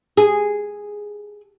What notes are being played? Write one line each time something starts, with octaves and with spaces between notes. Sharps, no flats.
G#4